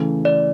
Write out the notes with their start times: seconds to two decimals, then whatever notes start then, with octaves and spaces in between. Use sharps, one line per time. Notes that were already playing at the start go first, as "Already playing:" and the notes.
Already playing: C#3 E3 A3
0.25 D5